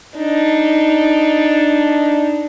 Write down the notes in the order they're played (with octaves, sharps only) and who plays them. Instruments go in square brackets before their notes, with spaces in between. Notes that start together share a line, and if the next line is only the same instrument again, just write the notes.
[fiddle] D4 D#4